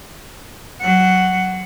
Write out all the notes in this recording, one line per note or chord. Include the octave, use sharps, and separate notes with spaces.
F#3 F#5